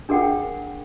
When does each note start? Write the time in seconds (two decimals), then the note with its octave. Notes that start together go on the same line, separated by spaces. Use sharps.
0.09 D4 G#4 A#4 F#5 G5